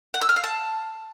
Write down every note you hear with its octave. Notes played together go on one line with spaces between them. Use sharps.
F#5
E6
F6
F5
A5